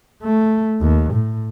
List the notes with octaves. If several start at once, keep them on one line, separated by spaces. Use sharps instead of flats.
A3
D#2
A2